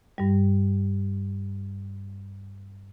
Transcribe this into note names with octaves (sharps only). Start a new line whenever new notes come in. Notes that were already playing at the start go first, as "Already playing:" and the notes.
G2 G3